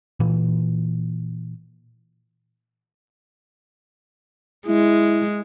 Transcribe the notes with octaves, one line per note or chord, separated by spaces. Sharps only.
A#2 E3
G#3 E4